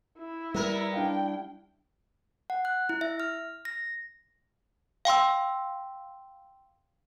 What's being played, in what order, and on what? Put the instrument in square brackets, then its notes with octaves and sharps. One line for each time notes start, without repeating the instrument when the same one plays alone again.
[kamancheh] E4
[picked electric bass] G3 [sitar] B3 A#4
[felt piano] D4 E4 F5 [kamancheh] G5
[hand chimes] F#5
F#6
E4
E5
F6
A#6
[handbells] F5 G5 C6 E6